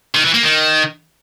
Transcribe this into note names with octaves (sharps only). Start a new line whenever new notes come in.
D#3
E3
A#3
D#3